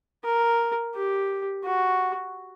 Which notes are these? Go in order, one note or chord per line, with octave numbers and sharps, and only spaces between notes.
A#4
G4
F#4